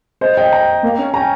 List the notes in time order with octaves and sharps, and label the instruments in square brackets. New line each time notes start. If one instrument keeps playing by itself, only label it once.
[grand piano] C5 D#5
D#5 G5
G5 A#5
[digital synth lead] A#3
C#4
[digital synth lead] C#4 [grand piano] G5 A#5